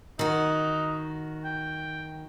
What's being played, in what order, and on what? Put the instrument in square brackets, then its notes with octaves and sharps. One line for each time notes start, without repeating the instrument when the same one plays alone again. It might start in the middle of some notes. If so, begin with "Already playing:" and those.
[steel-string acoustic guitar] D#3 F#4 [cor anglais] D#4
[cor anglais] G5